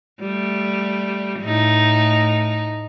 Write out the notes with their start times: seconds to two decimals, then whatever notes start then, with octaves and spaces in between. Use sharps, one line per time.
0.22 G3 A3
1.40 A2 A3 D#4